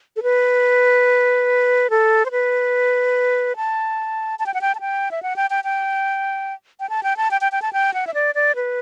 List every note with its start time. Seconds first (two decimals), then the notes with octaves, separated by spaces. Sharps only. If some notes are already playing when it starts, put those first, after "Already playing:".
0.16 A4
0.23 B4
1.90 A4
2.26 C5
2.31 B4
3.56 A5
4.39 A5
4.46 G5
4.54 F#5
4.61 G5
4.75 A5
4.80 G5
5.11 E5
5.23 F#5
5.36 G5
5.50 G5
5.64 G5
6.80 G5
6.90 A5
7.03 G5
7.17 A5
7.31 G5
7.41 G5
7.52 G5
7.62 A5
7.73 G5
7.94 F#5
8.07 E5
8.14 D5
8.35 D5
8.56 B4